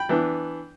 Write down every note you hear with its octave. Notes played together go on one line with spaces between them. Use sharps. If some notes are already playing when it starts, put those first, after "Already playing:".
Already playing: G5 B5
E3 B3 D4